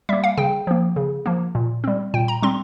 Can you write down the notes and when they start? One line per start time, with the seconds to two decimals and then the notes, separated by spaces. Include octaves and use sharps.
0.09 G3 A#3 E5
0.24 F5
0.37 C#3 G5
0.67 F3 A#3
0.96 C#3
1.26 F3 A#3
1.55 A#2
1.84 G3 C4
2.14 A#2 G5
2.28 A#5
2.43 G3 C4 C6